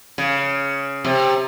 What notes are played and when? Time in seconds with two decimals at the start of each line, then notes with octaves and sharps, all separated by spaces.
0.18 C#3
1.05 C3